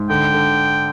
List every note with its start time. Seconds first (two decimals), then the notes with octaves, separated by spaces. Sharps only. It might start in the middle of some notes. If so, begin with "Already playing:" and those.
Already playing: G#2
0.10 D3 G5
0.34 D3